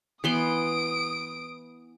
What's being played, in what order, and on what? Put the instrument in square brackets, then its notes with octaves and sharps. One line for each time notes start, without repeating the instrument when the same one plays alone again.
[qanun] E3 B3 C6 [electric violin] D#6 D7